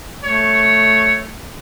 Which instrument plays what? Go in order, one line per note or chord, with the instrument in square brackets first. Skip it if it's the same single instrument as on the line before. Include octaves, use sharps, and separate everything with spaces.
[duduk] A3 [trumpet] C#5